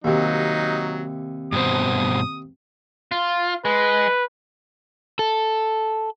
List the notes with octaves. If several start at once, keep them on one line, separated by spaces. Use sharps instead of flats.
D#2 C3 F#3 D#4
G2 B2 C5 D#6
F4
G#3 B4
A4